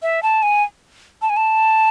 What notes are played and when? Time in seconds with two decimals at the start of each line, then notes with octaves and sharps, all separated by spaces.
0.02 E5
0.23 A5
0.43 G#5
1.22 A5
1.29 G#5
1.37 A5